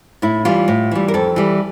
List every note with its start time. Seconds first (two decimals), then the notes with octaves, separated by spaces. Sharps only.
0.22 A2 E4
0.45 E3 G3 F4
0.68 A2
0.91 E3 G3
1.08 A#4
1.14 F2 A4
1.36 E3 G3